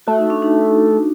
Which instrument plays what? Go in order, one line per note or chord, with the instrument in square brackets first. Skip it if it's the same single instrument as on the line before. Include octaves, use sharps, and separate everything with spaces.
[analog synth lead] A3 [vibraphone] F#4
[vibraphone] D#4
D4
D#4